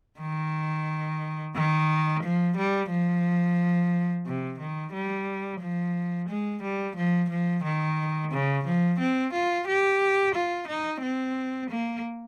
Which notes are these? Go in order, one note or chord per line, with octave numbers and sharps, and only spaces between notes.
D#3
D#3
F3
G3
F3
C3
D#3
G3
F3
G#3
G3
F3
F3
D#3
C#3
F3
C4
F4
G4
F4
D#4
C4
A#3